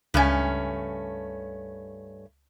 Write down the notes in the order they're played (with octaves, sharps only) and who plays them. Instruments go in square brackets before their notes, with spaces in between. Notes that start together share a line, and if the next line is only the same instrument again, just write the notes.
[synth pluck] C#2 G#5 [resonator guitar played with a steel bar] G2 A3 C#4